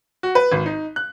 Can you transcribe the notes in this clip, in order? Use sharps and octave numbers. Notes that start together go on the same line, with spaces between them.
F#4
B4
G#1
D#4
F#6